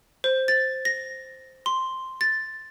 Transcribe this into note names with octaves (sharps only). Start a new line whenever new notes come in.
C5
A6
A#6
C6
A6